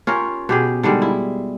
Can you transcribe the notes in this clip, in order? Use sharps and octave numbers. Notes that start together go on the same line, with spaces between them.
C#4 F4 G4 A#4
B2 G4 G#4
D3 D#3 G3 G#3
E4